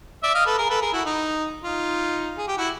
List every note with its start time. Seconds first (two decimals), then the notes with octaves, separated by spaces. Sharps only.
0.23 D5 E5
0.34 D#5 F5
0.46 A4 B4
0.58 G#4 A#4
0.69 A4 B4
0.82 G#4 A#4
0.93 E4 F#4
1.05 D#4
1.63 D#4 F4
2.38 G#4
2.47 G4
2.57 E4 F#4